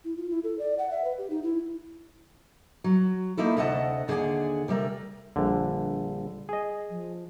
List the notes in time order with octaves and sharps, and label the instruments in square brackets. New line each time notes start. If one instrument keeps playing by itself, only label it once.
[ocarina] E4
F4
E4
A4
D5
F#5
E5
B4
G4
D#4
E4
[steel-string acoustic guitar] F#3
A3 A#3 D#4 E4 A4
D2 C3 A3 D#5 F#5 A5
D#2 D3 G#4 D5 F#5 G#5
C3 G3 A3 A#4
[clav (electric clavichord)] A#1 D3 [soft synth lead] G3
[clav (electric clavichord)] G#4 D#5
[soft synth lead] F3